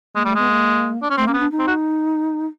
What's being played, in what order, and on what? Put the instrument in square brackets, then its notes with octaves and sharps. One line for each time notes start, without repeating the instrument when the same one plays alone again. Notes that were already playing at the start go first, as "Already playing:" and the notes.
[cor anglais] G#3 [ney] A#3
[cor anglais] G3 [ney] A3
[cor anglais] G#3 [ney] B3
[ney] A#3
[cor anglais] D4
C#4
[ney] A3 [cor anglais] C4
[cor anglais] A#3 [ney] C#4
[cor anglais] B3
[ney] D4
D#4
[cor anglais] C4
F#4